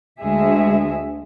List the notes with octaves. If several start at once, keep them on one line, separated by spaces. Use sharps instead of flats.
D2 G#3 G#4 E5